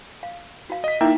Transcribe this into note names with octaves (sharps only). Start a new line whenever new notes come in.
F5
F#4 F5
D#5 B6
A#3 D#4 E4 E5 G5